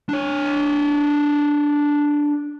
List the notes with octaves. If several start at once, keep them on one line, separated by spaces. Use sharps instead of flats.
D4 C#5